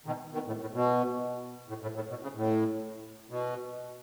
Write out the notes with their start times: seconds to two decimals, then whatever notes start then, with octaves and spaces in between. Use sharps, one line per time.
0.06 B2 D#3
0.33 B2 D#3
0.47 A2
0.61 A2
0.74 B2
1.69 A2
1.82 A2
1.95 A2
2.09 B2
2.23 C#3
2.36 A2
3.30 B2